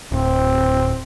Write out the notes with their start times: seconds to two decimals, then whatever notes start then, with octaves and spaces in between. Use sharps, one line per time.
0.12 D1 C4